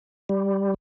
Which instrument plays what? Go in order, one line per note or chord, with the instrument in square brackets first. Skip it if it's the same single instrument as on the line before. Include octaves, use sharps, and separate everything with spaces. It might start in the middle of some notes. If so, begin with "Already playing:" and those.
[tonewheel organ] G3